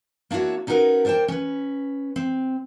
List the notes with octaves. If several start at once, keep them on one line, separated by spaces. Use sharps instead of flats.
A#3 D4 E4 F#4 C#5
C#4 D#4 F#4 G4 A#4 B4
D4 A#4 C5 D5 G5
C#4 B4
C4